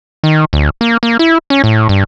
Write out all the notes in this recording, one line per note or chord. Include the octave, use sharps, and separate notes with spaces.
D#3
D2
A#3
A#3
E4
C#4
A2
G2